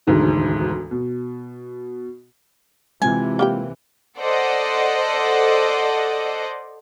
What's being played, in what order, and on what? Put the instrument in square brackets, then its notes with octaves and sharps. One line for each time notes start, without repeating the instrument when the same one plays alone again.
[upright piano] E1 D2 G#2 D#3
B2
[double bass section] C3 E3 [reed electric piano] G#3 C4 F4 [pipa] G#5
[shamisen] A#3 G4 G5
[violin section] A4 C5 D5 D#5 F#5